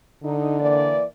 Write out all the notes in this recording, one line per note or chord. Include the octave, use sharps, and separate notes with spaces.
D3 D#4
E3 A#3 D5